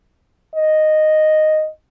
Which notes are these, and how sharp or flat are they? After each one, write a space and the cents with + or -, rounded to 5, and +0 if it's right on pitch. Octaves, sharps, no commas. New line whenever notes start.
D#5 -5